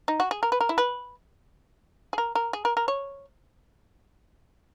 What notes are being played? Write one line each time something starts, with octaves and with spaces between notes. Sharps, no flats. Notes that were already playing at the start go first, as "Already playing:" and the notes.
D#4
F#4
G#4
A#4
B4
A#4
E4
B4
G#4
A#4
A#4
G#4
A#4
A#4
C#5